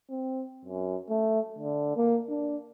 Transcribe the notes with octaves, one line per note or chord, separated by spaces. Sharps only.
C4
F#2
A3
D3
A#3
D4